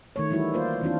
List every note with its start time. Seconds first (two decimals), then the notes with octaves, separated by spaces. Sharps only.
0.16 D#3 A3 C#5
0.30 E3 G3 A3 E4 F#4
0.54 A#3 F4 C5 D5
0.81 D#3 E3 C4 D4 F4